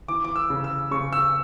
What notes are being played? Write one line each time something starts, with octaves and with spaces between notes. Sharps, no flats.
E3 D6
D6
E6
C#3
E6
C#3 C#6
E6